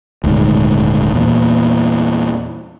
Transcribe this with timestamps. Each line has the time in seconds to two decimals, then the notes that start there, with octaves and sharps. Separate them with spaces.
0.24 D#1 D2 G#2
1.14 E2 A#2